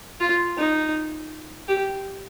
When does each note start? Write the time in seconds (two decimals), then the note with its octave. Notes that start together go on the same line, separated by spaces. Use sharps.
0.20 F4
0.57 D#4
1.68 G4